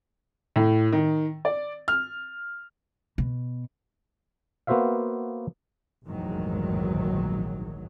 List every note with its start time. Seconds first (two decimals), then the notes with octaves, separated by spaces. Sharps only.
0.56 A2
0.93 D#3
1.45 D5
1.88 F6
3.18 B2
4.67 A#3 B3 F#4 C5 E5 F5
6.05 F1 A#1 E2 G#2 D#3 F#3